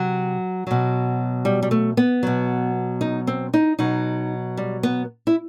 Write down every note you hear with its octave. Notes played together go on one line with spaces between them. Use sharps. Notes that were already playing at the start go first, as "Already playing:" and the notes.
Already playing: C3 F#3
B2 F#3
G3
G3
A3
B3
B2 F#3
D#4
C4
D#4
B2 F#3 D#4
G3
B3
E4